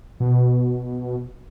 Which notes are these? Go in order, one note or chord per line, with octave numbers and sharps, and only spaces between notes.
B2